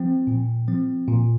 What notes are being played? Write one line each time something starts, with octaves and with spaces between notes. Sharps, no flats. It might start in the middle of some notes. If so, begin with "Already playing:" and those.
Already playing: F3 C4 G5
A#2
F3 C4
A#2